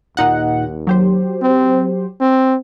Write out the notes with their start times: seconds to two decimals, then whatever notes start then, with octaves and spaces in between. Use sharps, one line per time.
0.17 D#2 A#2 D#4 F#5
0.87 F#3 G4 C5
1.41 C4
2.20 C4